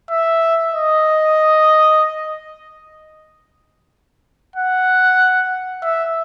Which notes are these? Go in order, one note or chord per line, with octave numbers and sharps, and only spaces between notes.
E5
D#5
F#5
E5